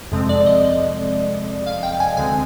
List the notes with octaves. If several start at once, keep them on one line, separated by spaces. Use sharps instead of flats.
F2 C3 F3 G#3 C4
D5
D#5
F5
G5
G#5
D2 D3 G#3 C4 G#5